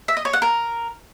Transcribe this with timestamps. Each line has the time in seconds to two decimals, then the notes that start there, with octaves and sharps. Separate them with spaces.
0.08 E5
0.17 D#5
0.25 C#5
0.33 F#5
0.42 A#4